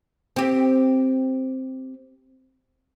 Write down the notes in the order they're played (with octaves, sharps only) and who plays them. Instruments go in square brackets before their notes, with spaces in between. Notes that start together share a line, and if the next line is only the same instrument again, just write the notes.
[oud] C4 G4